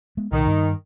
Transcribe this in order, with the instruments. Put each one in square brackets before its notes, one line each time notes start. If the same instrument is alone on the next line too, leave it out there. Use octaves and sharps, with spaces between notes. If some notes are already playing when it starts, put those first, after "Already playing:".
[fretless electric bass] G#3 B3
[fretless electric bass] C2 A#2 [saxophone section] D#3
[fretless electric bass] G2